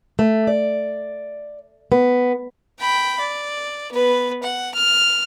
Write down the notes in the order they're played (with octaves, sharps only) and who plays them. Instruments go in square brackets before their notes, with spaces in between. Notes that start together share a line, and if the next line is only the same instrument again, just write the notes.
[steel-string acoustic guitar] A3
D5
B3
[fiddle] G5 B5
D5
B3 B4
F#5
F6